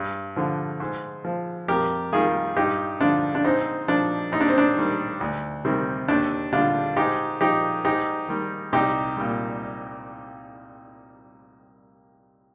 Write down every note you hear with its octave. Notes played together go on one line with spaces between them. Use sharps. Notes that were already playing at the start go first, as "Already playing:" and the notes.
Already playing: G2
D3 F3
G#2
F3
F2 G4 A#4
D#3 G3 F4 G#4
G2 D#4 G4
D3 F3 D4 F4
D4
G#2 C4 D#4
F3 D4
D#2 D#4
D4
C4
D4
D#3 G3
D2
C3 D#3 G3
D#2 D4
D3 G3 D4 F4
G#2 D#4 G4
F3 D#4 G4
G#2 D#4 G4
D#3 G3
C2 D#4 G4
A#2 G3